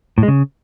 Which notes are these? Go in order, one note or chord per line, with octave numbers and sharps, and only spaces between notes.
A2
G#3
C#3